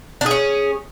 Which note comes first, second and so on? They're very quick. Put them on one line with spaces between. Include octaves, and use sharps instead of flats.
D4 G#4 C#4